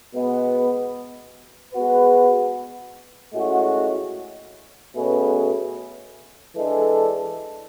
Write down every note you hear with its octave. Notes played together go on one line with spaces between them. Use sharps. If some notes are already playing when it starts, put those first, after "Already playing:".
B2 G#3 B3
G#3 B3 F#4 B4
A2 G#3 C#4 F#4
B2 A3 C#4 G#4 B4
E3 G#3 D4 A4